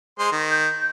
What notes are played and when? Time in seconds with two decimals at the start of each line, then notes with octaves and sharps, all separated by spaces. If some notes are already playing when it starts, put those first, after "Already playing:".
0.19 G#3 C5 C6
0.32 D#3
0.50 G6